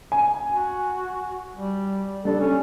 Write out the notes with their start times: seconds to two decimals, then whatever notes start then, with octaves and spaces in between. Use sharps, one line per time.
0.12 G#5
0.50 F#4
1.56 G3
2.25 G3 D4 A4
2.40 C#4